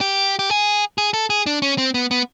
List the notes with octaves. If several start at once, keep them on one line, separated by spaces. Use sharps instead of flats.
G4
G4
G#4
G#4
A4
G#4
D4
C#4
C4
B3
B3